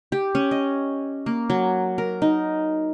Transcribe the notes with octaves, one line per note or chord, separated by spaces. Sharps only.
G4
C#4
D#5
A#3
F#3
A#4
D#4